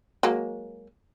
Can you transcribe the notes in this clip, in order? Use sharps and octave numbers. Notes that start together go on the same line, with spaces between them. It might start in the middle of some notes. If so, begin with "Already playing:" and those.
F#3 G#3 A#3